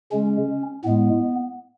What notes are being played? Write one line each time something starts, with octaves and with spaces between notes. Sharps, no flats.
C#3 G#3 C#4
A2 G#3 B3